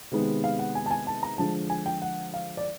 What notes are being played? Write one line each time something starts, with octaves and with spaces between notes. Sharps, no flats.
C3 D#3 G#3 B3
F5
F#5
G#5
A5
G#5
A5
A#5
D3 F3 G#3 A5
G#5
G5
F#5
F5
D5